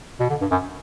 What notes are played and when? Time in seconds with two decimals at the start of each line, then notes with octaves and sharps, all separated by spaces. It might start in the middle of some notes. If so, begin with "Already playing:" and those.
0.20 B2
0.30 D3
0.41 G2
0.51 F#2